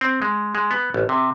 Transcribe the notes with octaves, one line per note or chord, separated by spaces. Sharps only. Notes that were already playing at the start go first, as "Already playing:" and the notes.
C4
G#3
G#3
B3
A1
C3